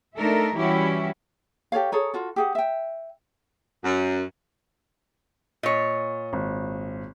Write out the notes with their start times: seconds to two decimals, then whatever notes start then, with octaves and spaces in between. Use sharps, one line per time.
0.17 A3 D4 D#4 A4 A#4 E5
0.55 E3 G3 C#4 E4 F#4 G4
1.72 G4 A4 C#5 F5
1.92 G#4 A4 C#5 A#5
2.14 F4 F#4 A4
2.36 G4 G#4 F#5
2.55 E5 G5
3.83 F#2
5.63 A#2 C#5 D#5
6.33 G#1